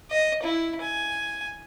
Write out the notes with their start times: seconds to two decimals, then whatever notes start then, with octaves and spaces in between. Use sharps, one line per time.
0.11 D#5
0.43 E4
0.82 G#5